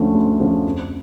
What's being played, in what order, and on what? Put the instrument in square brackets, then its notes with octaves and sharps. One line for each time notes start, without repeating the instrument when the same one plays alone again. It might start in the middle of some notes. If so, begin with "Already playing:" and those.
Already playing: [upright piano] D2 D3 F3 A3 C#4
D2
D3 F3 A3 C#4
F2